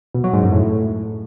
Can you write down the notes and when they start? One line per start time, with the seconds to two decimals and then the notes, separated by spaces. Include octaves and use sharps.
0.14 B2
0.24 F#3
0.33 G#2
0.43 F#2
0.52 A2